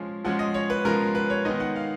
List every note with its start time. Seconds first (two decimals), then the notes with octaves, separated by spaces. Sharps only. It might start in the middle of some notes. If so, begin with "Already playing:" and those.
Already playing: F3 G#3 C#4
0.24 F3 G#3 C#4 F#5
0.39 D#5
0.54 C#5
0.70 B4
0.85 F3 G#3 C#4 A#4
1.15 B4
1.30 C#5
1.45 D#3 G#3 B3 D#4 D#5
1.60 F#5
1.76 F5